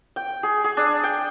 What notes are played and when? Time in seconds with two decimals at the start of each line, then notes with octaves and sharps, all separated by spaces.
0.16 G5
0.43 G#4
0.64 G#4
0.77 D4
1.04 G5